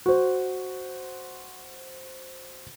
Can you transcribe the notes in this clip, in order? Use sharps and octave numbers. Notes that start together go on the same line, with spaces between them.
F#4 C5